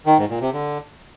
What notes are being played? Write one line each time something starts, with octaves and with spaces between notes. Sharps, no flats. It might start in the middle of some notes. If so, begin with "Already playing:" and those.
D#3
G#2
A#2
C3
D3